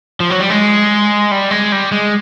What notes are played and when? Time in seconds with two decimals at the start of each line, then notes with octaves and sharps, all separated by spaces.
0.20 F3
0.30 F#3
0.40 G3
0.50 G#3
1.31 G3
1.51 G#3
1.72 G3
1.92 G#3